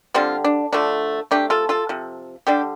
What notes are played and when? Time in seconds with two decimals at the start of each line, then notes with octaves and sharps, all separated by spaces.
0.14 D3 G3 C4 F4
0.44 D4
0.73 D3 F3 A3 D4
1.31 C3 A3 D4 G4
1.50 F4 A4
1.69 F4 A4
1.89 C3 F3
2.47 D3 G3 D4 G4